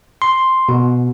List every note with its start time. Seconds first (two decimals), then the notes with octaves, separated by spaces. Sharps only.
0.22 C6
0.69 B2